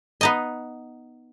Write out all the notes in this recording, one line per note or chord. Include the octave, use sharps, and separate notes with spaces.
B3 D#4 D#5